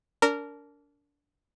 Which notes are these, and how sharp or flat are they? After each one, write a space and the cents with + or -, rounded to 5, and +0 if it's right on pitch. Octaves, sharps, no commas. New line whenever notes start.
D4 -30 A#4 -15